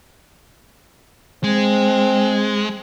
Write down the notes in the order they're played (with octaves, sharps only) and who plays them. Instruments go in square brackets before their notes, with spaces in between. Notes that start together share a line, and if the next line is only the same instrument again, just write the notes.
[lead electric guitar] G#3 [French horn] C4